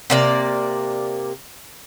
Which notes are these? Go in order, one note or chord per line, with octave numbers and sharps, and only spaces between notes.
C3 A#3 D5